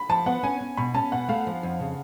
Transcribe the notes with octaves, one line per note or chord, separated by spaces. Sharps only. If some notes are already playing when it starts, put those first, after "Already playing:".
Already playing: B5
F3 A5
B3 F#5
C#4 G#5
C#4
B2 B5
C#4 A5
B2 F#5
A3 F5
F3
F2
C#3